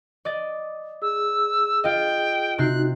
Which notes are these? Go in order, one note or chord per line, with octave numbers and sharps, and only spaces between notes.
D5 D#5 A6
G#4 E6
F4 D#5 G5
C3 D#4 F#4 G5 F#6 C7